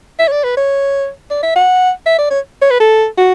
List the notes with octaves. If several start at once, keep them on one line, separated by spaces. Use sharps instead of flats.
E5
C#5
D5
B4
C#5
D5
E5
F#5
E5
D5
C#5
C#5
B4
A4
F#4